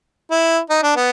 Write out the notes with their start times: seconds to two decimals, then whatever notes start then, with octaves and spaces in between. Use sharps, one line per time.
0.31 E4
0.70 D#4
0.83 D4
0.96 B3